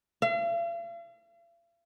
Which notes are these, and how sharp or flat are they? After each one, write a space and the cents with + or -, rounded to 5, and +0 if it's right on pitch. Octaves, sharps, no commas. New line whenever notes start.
F5 -45